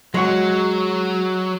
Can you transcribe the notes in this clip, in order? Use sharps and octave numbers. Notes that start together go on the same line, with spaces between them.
F#3 G#3 F#4